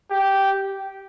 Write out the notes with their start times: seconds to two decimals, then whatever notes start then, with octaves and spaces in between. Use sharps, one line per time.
0.10 G4